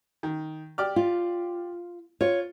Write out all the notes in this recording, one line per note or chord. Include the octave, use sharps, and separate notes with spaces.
D#3
G4 D5 F6
F4
F4 C#5